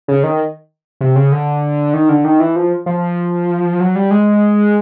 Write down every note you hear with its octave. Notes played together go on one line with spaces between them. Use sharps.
C#3
D#3
C3
C#3
D3
D#3
D3
D#3
E3
F3
F3
F#3
G3
G#3